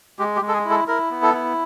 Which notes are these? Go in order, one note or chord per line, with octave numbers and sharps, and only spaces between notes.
G#3 G4
G4
G#3
A4
G#4
E4
A4
E4 A#4
B3
A4
E4